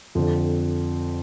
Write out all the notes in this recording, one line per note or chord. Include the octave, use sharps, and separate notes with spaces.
F2 D3